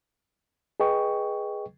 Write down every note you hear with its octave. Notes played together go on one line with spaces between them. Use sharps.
G#4 B4 D#5 G5 C#6